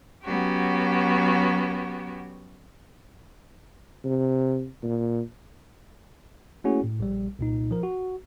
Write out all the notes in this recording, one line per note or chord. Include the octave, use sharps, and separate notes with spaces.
F#3 B3 C#4 F#4 G4
C3
A#2
A3 A#3 C#4 E4 F#4 G#4
A2
A#1 G3
C2 A#2 D#4
F3 A#4
F#4